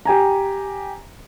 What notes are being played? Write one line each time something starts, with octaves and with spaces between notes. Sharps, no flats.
G4 G#5 A#5